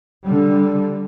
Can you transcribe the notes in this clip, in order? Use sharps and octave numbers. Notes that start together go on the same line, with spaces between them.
D3 G3